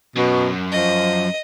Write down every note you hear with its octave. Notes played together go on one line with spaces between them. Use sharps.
F#2 B2
F3 D#5